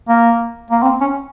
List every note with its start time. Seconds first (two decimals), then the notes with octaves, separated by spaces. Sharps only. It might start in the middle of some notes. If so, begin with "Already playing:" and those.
0.08 A#3
0.71 A#3
0.82 C4
1.01 C#4